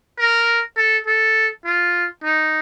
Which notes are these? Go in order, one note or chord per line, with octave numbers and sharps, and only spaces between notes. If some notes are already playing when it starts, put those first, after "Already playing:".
A#4
A4
A4
F4
D#4